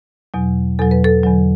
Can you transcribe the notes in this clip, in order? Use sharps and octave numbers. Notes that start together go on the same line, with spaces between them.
E2 B2 F#3
E2 B2 F#3 A4
B4
A4
E2 D3 F#3